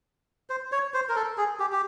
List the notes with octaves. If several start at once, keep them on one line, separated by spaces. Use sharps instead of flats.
C5
C#5
C5
A#4
A4
G#4
G4
G4